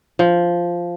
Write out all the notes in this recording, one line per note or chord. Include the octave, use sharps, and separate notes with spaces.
F3